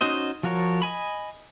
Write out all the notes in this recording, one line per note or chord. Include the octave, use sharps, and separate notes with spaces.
C#4 D#4 F#4 C5 D#5
F3 F4 F#4 A#4 C#5
D#5 G#5 B5